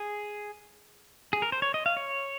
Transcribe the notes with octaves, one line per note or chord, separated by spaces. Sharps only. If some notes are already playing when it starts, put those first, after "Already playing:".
Already playing: G#4
G#4
A#4
C5
C#5
D#5
F5
C#5